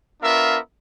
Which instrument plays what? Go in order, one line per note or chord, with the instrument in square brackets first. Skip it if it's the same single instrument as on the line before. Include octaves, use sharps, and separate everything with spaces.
[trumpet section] B3 D4 F4 A#4 E5 F5